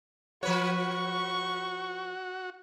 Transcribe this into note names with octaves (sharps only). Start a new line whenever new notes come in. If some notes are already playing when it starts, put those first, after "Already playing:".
F3 F#4 B4 C#5 C#6